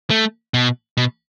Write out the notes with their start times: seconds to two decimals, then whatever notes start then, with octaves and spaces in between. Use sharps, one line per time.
0.10 A3
0.54 B2
0.97 B2